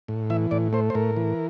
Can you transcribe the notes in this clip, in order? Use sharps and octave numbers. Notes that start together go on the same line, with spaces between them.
A2
E3 E5
A2 D5
A3 C5
C5
A2 A#4
E3